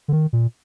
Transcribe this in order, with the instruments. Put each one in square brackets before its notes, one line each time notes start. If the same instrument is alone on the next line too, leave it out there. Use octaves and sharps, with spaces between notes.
[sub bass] D3
D#3
A#2